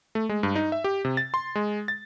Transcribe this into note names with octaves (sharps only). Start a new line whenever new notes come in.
A3
G#3
G2
D#4
E5
G4
C3
A6
C6
G#3
A6